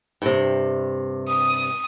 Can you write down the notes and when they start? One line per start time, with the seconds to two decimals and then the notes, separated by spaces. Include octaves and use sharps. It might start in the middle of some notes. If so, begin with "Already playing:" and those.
0.22 G2 C3
1.28 D#6